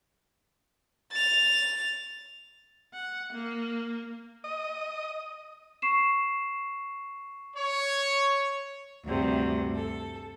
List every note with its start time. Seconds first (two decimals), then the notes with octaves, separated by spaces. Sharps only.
1.13 A6 F7
2.93 F#5
3.33 A#3
4.44 D#5
5.82 C#6 C7 E7
7.56 C#5
9.04 D2 G2 C3
9.74 A4